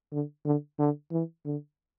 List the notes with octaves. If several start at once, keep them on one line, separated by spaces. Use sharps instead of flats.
D3
D3
D3
E3
D3